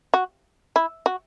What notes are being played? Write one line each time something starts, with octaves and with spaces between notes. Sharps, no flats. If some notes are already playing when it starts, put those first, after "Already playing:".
F#4
E4
F#4